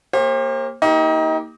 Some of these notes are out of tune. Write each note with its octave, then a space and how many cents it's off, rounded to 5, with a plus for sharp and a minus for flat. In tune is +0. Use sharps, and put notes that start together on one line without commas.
A#3 +0 G4 +35 C5 +40
A#3 -10 D#4 +30 G4 +0